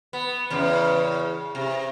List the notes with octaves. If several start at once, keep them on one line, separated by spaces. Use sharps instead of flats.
B3
E2 C#3
C3